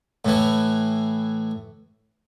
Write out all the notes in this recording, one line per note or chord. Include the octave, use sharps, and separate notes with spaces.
A2 E3